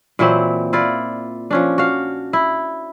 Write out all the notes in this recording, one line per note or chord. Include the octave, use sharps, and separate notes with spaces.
A#2 E3 F#3 C4
E4 F4 D5
F3 C#4 D4
F#4 F5
E4